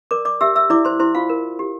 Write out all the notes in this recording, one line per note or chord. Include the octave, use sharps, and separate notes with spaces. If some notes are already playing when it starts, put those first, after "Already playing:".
A#4 D5 D6
D5 D6
G4 E5 E6
E5 E6
E4 D5 D6
C5 C6
E4 C5 C6
F4 F5
A#4
G4